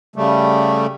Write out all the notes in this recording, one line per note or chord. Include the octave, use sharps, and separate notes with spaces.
C#3 G3 A3